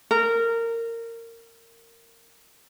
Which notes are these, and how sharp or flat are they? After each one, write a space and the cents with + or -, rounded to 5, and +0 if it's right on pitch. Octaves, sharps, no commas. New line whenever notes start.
A#4 -20